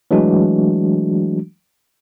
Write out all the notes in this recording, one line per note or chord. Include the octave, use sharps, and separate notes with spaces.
E3 F#3 G#3 A3 D4 F#4